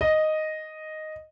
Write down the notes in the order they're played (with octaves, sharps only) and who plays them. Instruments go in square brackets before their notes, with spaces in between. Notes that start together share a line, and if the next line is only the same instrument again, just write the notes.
[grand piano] D#5